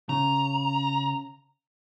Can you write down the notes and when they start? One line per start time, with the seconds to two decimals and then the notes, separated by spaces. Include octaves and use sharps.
0.09 C#3 A#5